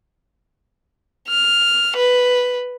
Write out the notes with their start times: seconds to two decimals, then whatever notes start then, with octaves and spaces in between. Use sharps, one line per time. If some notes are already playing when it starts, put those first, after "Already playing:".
1.29 F6
1.96 B4